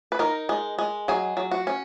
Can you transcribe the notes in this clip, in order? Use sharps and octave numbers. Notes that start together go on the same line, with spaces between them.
B4
D#4 A#4
G#3
G#3
F#3 G#4
F#3
F#4
C#4